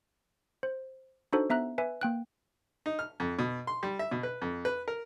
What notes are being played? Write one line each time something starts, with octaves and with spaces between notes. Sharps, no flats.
C5
D4 D#4 F#4 A4 C5
B3 E5 A#5 F#6
B4 E5 G#5
A#3 G5 F#6
D#4
F6
F2
B2
C6
G3
E5
B2
B4
F2
B4
A#4